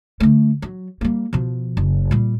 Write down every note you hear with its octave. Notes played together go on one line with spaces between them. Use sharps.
D3 A3
F#3
G3 A#3
B2 F3
F#1
A#2 G3